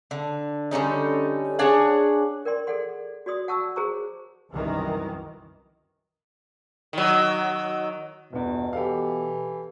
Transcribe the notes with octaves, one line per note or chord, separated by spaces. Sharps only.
D3
D3 G3 C#4 D#4
D4 G#4 C#5 F#5
A#4 D5 G5 C6
G#4 A4 D5 F#5 C6
F#4 D5 C6 D#6
F#5 A5 C#6 E6
G#4 C5 A#5 C#6
C2 F#2 D#3 E3
D#3 F#3
G1 E2 B2
E3 G4 A4 F5